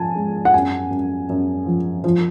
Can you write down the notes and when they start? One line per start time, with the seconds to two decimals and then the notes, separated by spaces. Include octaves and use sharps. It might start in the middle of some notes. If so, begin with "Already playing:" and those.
Already playing: F3 G#5 A5
0.15 G#3
0.45 F#5
0.54 F#2 G#5
0.91 F#2
1.29 F#2
1.66 F3
2.04 F3